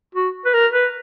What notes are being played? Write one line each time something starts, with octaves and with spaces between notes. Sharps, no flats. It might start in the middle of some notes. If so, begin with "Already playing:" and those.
F#4
B4
A#4
B4